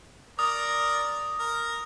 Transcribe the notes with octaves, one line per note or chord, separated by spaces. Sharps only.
A#4 D5 D#6
A#4